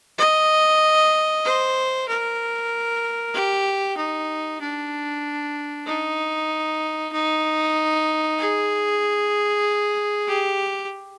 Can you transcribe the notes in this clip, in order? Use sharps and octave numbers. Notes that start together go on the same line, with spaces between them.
D#5
C5
A#4
G4
D#4
D4
D#4
D#4
G#4
G4